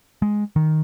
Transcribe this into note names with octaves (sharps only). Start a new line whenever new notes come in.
G#3
D#3